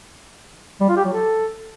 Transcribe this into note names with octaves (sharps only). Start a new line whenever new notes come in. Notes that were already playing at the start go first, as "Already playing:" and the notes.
G3
F4
G4
F#3
A4